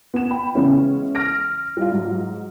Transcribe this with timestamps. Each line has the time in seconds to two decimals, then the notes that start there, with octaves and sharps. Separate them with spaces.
0.14 B3 E7
0.31 G5 B5
0.55 C#3 E3 G#3 B3 C#4 E4
1.15 F6 A#6 D7
1.77 G3 E4 F4
1.92 G#2 F#3